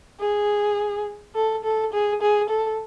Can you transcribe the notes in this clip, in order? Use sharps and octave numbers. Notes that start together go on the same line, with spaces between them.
G#4
A4
A4
G#4
G#4
A4